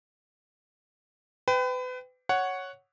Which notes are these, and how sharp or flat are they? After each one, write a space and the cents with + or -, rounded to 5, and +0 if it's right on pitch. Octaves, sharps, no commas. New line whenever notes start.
B4 +35 G5 +0
C#5 +0 F#5 +0